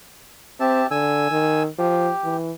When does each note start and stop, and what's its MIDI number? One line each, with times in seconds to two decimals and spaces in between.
0.60 0.83 60
0.60 0.87 67
0.60 0.87 76
0.60 0.87 81
0.91 1.31 50
0.91 1.63 80
0.91 1.63 88
1.31 1.67 51
1.79 2.11 53
1.79 2.36 67
2.24 2.52 52